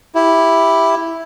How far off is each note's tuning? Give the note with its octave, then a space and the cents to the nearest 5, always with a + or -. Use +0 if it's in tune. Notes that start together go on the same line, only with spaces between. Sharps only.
E4 +0 G4 +0